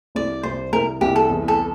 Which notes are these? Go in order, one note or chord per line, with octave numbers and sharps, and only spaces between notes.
C2 D5
C2 C5
C2 A#4
C2 G4
A4
E2
A4